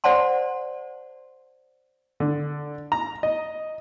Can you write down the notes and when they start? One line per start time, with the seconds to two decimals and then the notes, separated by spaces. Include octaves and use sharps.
0.04 C5 D5 F#5 A5 C6
2.20 D3
2.92 A#5
3.23 D#5